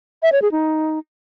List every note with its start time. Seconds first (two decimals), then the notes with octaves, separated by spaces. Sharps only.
0.23 E5
0.32 C#5
0.42 G#4
0.52 D#4